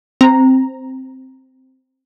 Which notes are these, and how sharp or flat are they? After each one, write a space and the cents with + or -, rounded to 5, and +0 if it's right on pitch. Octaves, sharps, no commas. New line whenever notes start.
C4 +0 A#5 +0